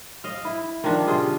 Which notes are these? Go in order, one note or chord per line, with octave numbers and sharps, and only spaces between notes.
D#5 F5
E4
D#3 F3 D4
C3 F4 G#4